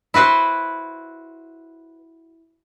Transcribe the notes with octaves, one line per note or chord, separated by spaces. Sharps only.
E4 F#4 B4 C5